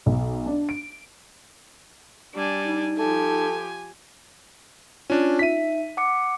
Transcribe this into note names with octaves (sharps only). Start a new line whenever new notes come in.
B1
D4
D7
G3 D4 G#5
D#4
F3 G4 A4 G#5
C#4 D4 F4
D#4 E5 B6 D#7
F#5 D6 C#7